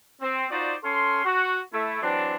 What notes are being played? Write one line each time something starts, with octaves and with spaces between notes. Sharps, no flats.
C4
D#4 F4 F#4 C5 D5
C#4 A4 F5 C6
F#4
A3 E4
E3 F#3 C4 D4